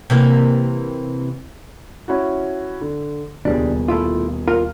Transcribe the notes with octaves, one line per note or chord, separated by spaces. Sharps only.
C3 E3 A#3
C#4 E4 F#4
D3
D#1 C#2 B2 G3 D4 G#4
A3 E4 F4
F4 A#4